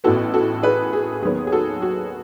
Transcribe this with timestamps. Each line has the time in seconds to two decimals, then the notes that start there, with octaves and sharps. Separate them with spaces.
0.04 A1 A2 E3 B3 F#4 A4
0.34 F#4 A4
0.63 G#4 B4
0.93 G#4
1.22 D#2 D#3 F#3 B3 G#4
1.47 G#4
1.52 F#4 A4
1.82 F#4